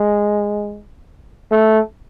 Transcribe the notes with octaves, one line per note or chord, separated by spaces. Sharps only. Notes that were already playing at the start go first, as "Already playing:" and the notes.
Already playing: G#3
A3